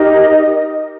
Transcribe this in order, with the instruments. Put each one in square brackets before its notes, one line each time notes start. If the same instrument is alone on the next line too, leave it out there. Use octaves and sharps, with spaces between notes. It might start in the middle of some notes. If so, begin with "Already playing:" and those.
Already playing: [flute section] D#4 G4 A#4 D#5